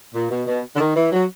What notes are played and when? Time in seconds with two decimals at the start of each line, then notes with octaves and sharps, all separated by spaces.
0.15 A#2
0.30 B2
0.47 B2
0.76 D3
0.80 D#3
0.95 E3
1.12 F#3